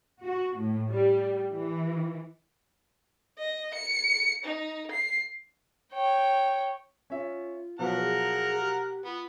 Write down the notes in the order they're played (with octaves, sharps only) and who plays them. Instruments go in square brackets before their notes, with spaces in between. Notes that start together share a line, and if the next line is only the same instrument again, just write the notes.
[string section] F#4
A2
G3
E3
[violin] D#5
C#7
D#4
C7
C#5 G5
[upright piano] C#4 E5 [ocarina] F4
[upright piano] B2 F3 F#3 [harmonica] A#4 F#5 A#5 [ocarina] B4
[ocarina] G#4
G4
[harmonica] B3 [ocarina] F4